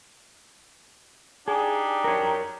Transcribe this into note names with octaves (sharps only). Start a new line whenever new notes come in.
D4 D#4 G4 G#4
A#4 C#5